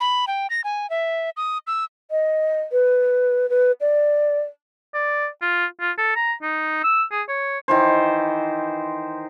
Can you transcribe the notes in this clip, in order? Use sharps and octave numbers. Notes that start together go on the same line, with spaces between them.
B5
G5
A#6
G#5
E5
D#6
E6
D#5
B4
B4
D5
D5
F4
F4
A4
A#5
D#4
E6
G#4
C#5
D#3 E3 C5